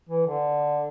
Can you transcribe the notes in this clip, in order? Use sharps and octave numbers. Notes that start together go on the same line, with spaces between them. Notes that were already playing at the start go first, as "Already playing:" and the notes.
E3
D3